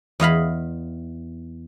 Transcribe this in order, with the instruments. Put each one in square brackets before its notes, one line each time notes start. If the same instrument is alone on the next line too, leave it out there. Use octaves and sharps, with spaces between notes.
[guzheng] E2 D#5 F5 B5